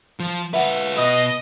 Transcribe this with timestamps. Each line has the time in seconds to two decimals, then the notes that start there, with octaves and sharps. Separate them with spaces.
0.20 F3
0.54 F4 B4 E5 F#5
0.97 B2 B4 D#5